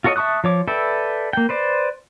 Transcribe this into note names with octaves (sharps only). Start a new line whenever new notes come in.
F4 F#4 A4 C#5 D#5
E5 A5 C#6 D#6 F#6
F3 C#5 D6
A4 B4 D5 E5 G5
A#3 G5
B4 C5 D5